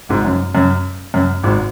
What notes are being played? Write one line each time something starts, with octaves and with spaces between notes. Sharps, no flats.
G#1 G#2
F#2
F#2
F#2
G#1 G#2